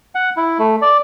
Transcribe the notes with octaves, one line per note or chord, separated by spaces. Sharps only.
F#5
E4
A3
D5